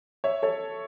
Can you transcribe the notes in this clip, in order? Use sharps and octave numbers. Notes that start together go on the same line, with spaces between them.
C#5 E5
A4 C#5